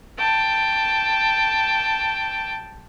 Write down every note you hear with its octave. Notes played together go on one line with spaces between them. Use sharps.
G5 A5